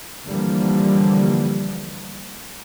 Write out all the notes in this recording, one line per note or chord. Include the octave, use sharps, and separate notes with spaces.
D3 E3 F3 G3 A#3